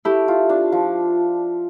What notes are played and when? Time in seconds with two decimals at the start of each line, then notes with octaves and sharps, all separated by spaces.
0.05 A3 E4 G4
0.28 F4
0.49 D4
0.72 F3